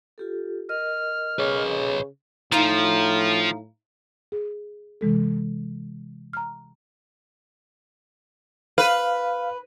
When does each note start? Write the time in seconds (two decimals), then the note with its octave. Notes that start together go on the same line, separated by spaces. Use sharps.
0.18 F4 G4 A4
0.69 A#4 D#5 F6
1.39 C#3 B4 C#5
2.52 A2 F3 D#4 F5 A#5
4.32 G#4
5.01 C3 E3 G#3 A4
6.33 A#5 F6
8.78 B4 F5